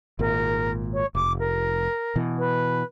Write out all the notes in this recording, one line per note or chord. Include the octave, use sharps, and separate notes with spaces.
G#1 A#2 A#4
C#5
F1 D6
A#4
B2 E3
B4